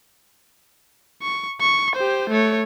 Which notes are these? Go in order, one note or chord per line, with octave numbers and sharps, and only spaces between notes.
C#6
C#6
G4 C5
A3 C#5